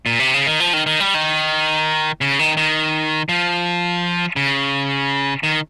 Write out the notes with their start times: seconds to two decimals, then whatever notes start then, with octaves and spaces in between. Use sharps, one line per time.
0.06 A#2
0.19 C3
0.34 C#3
0.46 D#3
0.60 F3
0.73 D#3
0.86 D#3
1.00 G3
1.14 D#3
2.21 C#3
2.39 D#3
2.57 D#3
3.29 F3
4.36 C#3
5.43 D#3